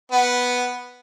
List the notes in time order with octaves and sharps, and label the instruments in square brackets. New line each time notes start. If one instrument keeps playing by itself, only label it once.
[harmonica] B3